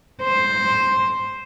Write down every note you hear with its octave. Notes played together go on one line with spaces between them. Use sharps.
C5